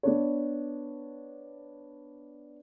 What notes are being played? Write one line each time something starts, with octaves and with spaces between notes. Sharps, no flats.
B3 D4 C#5